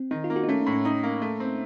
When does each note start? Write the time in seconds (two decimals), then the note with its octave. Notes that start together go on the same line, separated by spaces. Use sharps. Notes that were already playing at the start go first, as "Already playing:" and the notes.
Already playing: C4
0.11 D#3 D#4
0.24 F4
0.30 A#3
0.36 F#4
0.43 D#4
0.48 A3 C#4
0.61 D#4
0.66 A2
0.73 C#4
0.85 C#4 D#4
1.03 A#3
1.22 A3
1.40 C4